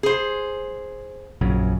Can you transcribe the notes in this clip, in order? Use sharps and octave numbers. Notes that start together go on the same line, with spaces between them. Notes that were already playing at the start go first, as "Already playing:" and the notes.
G#4 C5
A#1 F#2 C#3